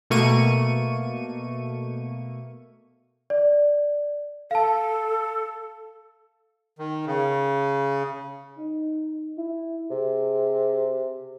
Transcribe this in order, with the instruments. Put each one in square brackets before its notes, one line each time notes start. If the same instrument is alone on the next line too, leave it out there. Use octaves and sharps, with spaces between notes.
[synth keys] B2 A3 A#3 C#6 D#7
[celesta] D5
[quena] A4 [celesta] F5 A5
[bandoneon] D#3
C#3
[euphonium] D#4
E4
[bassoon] C3 [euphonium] G#4